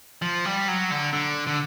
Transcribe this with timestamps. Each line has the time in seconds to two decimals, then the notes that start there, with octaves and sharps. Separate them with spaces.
0.22 F3
0.45 G3
0.68 F#3
0.91 D3
1.13 D3
1.47 D3